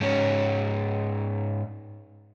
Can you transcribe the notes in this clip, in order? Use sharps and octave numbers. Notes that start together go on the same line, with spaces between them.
G#2 C#4